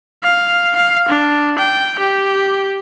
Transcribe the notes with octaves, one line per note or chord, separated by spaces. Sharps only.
F5
F5
D4
G5
G4